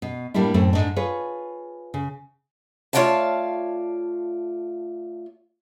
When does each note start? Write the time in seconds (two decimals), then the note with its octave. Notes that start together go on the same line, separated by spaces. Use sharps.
0.02 B2
0.34 A2 G3 A#3 D4 E4
0.54 F#2 A2 A3 C4
0.73 G#2 D4
0.96 F4 G#4 B4 C#5
1.94 C#3
2.93 A3 F4 C#5 D5 F5 A5